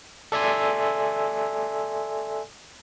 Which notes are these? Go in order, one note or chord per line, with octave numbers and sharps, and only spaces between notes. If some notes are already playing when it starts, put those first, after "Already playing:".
A4 D5 E5 G#5 C6